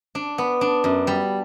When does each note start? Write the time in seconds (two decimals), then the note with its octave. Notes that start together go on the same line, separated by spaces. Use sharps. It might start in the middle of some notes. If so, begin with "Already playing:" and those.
0.15 D4
0.38 B3
0.61 D4
0.84 F#2
1.07 G3